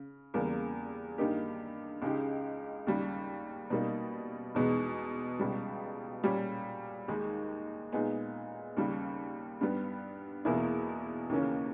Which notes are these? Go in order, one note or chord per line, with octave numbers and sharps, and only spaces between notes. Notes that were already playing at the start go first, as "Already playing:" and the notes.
Already playing: C#3
E2 C#3 G3 A#3
G2 D#3 A#3 D#4 G4
C#2 C#3 G#3 D#4 G4
D#2 C#3 G3
B2 G3 A#3 D#4
E2 B2 G#3 B3 D#4
C#2 B2 G3
A#2 G3 C#4 G4
D#2 D#3 G#3 D#4
A#2 G#3 B3 D#4 G#4
D#2 C#3 G3
G2 G3 B3
E2 B2 A#3 E4 G#4
D#2 C#3 E3 A#3 C#4